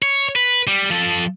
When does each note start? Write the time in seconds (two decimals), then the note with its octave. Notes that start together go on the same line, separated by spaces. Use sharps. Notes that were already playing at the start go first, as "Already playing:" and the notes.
0.02 C#5
0.36 B4
0.67 G3
0.90 F3 A4